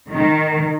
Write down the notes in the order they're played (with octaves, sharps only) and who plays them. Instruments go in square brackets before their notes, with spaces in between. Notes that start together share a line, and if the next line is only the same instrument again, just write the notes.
[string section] D#3